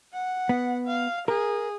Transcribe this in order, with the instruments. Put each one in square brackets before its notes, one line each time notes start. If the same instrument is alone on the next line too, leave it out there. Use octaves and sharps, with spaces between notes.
[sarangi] F#5
[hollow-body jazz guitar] B3
[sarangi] F5
[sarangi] G#4 [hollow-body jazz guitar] A#4